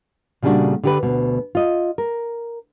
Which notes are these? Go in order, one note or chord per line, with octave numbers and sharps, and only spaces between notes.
A#2 C#3 G3 A3 D4 F#4
D3 G4 B4
D2 B2
F4 D#5
A#4